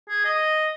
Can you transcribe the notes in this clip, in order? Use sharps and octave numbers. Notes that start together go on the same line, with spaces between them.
G#4
D#5